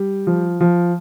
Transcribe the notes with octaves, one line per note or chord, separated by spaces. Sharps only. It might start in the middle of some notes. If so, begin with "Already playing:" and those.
Already playing: G3
F3
F3